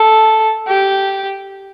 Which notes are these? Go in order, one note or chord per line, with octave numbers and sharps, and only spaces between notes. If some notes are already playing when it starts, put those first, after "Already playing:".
Already playing: A4
G4